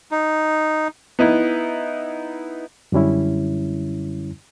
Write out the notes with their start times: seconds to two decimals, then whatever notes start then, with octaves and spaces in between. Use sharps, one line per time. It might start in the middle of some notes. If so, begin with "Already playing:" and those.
0.11 D#4
1.19 B3 D#4 E4
2.92 F#2 D3 G3 C#4 E4